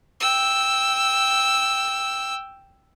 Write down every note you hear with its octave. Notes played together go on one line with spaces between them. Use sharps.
G5 E6